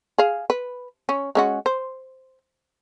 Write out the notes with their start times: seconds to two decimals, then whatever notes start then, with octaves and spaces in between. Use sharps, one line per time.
0.18 G#4 F5
0.50 B4
1.09 C#4
1.35 G#3 C#4 F#4
1.66 C5